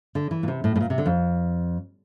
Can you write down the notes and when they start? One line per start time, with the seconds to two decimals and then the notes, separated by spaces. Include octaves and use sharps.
0.15 D3
0.31 E3
0.43 A#2
0.48 C3
0.64 A2
0.76 A2
0.81 A#2
0.90 C3
0.98 D3
1.06 F2